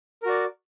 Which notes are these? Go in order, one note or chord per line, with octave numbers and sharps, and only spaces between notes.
F#4 A#4 D5